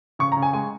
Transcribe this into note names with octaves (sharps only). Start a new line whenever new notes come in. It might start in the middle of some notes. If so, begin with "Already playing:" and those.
C#3 C#6
A#5
C#3
G#5
G#3 G#5